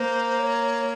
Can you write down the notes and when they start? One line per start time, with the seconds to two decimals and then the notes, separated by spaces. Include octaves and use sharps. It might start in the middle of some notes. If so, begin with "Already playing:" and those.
Already playing: A#3 C5
0.39 C#5